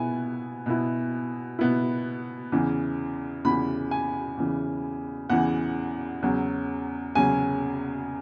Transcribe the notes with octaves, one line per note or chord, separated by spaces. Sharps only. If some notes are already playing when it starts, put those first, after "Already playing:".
Already playing: B2 B3 E4 G#5
B2 B3 E4
B2 B3 E4
E2 C#3 E3
E2 C#3 E3 B5
G#5
E2 C#3 E3
E2 C#3 E3 F#5
E2 C#3 F#3
E2 C#3 F#3 G#5